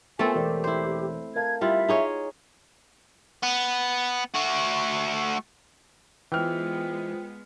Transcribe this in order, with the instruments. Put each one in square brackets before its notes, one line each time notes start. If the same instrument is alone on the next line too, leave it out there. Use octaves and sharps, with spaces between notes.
[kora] A3 C4 A4 [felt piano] B3 F4 A#4 [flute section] G#5
[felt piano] E1 A#4 D5 [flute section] G4
[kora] E4 C5
[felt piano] A#4 F5 A5 [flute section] G#6
[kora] G3 E4 F4 [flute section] E5
[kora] D#4 G#4 C#5
[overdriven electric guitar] B3
A3 F#4
[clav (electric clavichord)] E3 [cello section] G#3 B3 [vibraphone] F4 C5 [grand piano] G5 F6